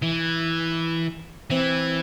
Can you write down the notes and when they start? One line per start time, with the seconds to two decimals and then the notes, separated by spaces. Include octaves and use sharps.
0.02 E3
1.50 E3 C4